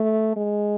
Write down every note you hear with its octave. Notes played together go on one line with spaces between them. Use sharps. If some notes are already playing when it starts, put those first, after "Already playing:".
Already playing: A3
G#3